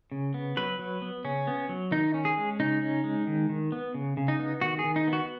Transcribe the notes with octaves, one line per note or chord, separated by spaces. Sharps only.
C#3
B3
F#3 B4
F#3
B3
C#3 C#4
B3
F#3
D#3 D#4
C#4
G#4
G#3
C#3 D#4
C#4
G#3
D#3
D#3
B3
C#3
C#3
D#4
B3
D#3 F#4
G#4
D#3
D#4
B3
F#4